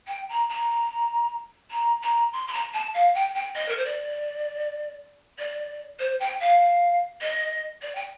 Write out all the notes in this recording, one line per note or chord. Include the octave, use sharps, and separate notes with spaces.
G5
A#5
A#5
A#5
A#5
C6
C6
A#5
A5
F5
G5
G5
D#5
A#4
C5
D5
D5
C5
G5
F5
D#5
D5
G5